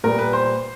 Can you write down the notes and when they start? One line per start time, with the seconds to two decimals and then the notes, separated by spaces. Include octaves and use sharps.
0.04 A#2 G3 B3 A#4
0.19 B4
0.33 C5